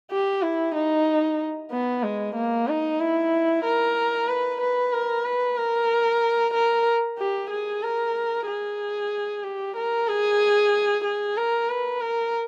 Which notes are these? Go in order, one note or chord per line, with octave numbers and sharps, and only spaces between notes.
G4
E4
D#4
B3
G#3
A#3
D#4
E4
A#4
B4
B4
A#4
B4
A#4
A#4
G4
G#4
A#4
G#4
G4
A#4
G#4
G#4
A#4
B4
A#4